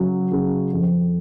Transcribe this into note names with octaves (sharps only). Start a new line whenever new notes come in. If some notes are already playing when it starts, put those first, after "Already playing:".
Already playing: C#3 F#3
C#3
F2